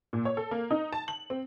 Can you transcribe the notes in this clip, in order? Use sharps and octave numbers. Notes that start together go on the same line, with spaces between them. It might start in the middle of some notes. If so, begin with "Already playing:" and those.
A#2
C#5
A4
A#3
D#4
A5
F#7
C4